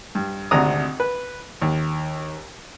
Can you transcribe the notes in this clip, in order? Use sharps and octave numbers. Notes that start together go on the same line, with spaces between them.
G2
G#1 D2 C3 D4 A#5 D#6
B4
D#2